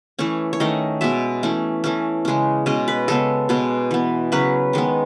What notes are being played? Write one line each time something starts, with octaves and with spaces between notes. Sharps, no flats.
E3 A3 C#4 C#5
C#5
D#3 A3 C#4 D#5
B2 G#3 B3 E5
E3 A3 C#4
E3 A3 C#4
C#3 G#3 C#4
B2 G#3 C#4 D#5
B4
C#3 G#3 B3 A4
B2 G#3 B3
E3 B3
C#3 F#3 C#4 B4
D#3 G#3 B3